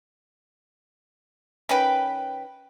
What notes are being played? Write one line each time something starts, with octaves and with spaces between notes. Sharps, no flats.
D#3 C#4 B4 G5 B5